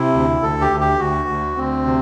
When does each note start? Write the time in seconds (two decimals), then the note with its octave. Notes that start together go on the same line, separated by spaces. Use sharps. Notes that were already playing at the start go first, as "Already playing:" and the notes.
Already playing: C3 E4
0.13 D2
0.42 D2 A4
0.61 G4
0.70 D2
0.80 G4
0.99 D2 F#4
1.29 D2
1.57 D2 C4
1.85 C3